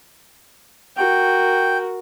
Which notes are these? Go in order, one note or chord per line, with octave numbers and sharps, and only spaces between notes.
F#4 A#4 G5